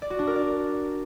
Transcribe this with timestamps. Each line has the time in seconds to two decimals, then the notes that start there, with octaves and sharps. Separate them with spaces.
0.02 D5
0.10 F#4
0.19 D4
0.27 A#4
0.36 D5